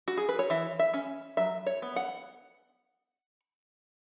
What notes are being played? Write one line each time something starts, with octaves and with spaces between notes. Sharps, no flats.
F#4
G#4
B4
C#5
E3 E5
E5
C#4
F#3 E5
C#5
B3
F#5